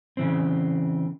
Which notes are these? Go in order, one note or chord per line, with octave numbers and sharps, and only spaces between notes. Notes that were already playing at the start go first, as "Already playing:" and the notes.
C#3 E3 C4